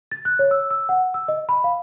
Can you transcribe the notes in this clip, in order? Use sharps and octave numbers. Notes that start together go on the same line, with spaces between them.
A6
F#6
C#5
E6
E6
F#5
E6
D#5
B5
F5